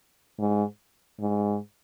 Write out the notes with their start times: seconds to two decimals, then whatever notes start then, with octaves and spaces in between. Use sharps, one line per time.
0.39 G#2
1.20 G#2